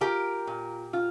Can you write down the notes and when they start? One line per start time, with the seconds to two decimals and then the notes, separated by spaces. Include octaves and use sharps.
0.01 F4 G4 A#4
0.47 A#2
0.93 F4